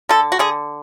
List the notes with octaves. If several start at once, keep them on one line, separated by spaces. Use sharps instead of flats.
D3 A4
F#4
D3 G#4